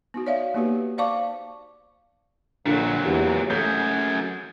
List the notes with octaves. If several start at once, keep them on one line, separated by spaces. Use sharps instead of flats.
B3 D#4 F#4
C#5 D5 E5 F5
A#3 B3 D#4 F#4 G4 B4
C5 D5 F5 A5 C#6 D6
A#1 A#2 D3 F#3
E2 G4
F#2 A3 G#4 G6